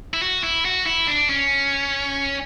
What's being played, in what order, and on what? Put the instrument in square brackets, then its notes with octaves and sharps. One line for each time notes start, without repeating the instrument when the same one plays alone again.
[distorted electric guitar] E4
F#4
E4
F#4
E4
D4
C#4